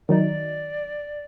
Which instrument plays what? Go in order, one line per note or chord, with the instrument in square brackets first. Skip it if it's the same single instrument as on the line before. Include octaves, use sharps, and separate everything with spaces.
[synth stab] D#3 F#3 D#4 [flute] D5